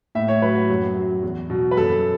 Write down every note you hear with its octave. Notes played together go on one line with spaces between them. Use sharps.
A2 E5
C#5
F#3 B4
F#4
F#2
F#3
E2
B2 F#3
B4
F#2 A4